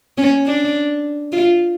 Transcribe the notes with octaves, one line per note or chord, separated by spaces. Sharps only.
C#4
D4
F4